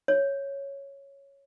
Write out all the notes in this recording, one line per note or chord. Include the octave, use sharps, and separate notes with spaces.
C#5